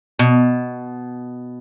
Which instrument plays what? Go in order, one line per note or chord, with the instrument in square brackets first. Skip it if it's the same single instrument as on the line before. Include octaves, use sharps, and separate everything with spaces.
[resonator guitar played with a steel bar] B2